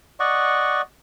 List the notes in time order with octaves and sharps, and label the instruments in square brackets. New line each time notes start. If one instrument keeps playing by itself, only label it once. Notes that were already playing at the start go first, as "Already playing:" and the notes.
[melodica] D5 D#5 F#5 C#6